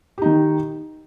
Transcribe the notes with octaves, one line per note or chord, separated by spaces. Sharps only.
D#3 D#4 G4